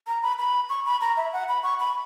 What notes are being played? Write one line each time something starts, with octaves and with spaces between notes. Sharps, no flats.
A#5
B5
B5
C#6
B5
A#5
E5
F#5
B5
C#6
B5